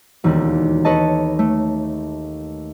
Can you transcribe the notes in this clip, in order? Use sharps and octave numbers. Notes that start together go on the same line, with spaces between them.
E1 D#2
A4 B4 C#5 D#5 A5
A3